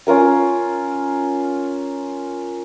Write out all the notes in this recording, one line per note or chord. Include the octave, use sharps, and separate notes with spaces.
C#4 F4 A#4 A#5